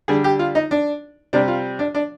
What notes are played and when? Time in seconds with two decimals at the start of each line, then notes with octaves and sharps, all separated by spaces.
0.08 D3 G3 G#4
0.24 G4
0.39 F4
0.55 D#4
0.71 D4
1.33 C3 G3 D4
1.48 F4
1.79 D4
1.94 D4